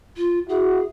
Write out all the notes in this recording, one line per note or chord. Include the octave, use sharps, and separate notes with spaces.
F4
E4 F#4 G#4